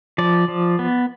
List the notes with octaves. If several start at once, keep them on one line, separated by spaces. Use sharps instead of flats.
F3 D5
F3
B3